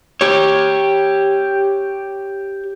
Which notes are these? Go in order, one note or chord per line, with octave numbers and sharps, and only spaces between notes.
G4 C#5